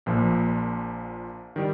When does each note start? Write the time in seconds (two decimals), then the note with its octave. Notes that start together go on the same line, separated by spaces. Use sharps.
0.06 A#1 A#2 F3
1.56 D#3 G3